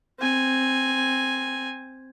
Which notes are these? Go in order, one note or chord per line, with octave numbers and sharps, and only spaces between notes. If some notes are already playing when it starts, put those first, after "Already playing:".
C4 G#5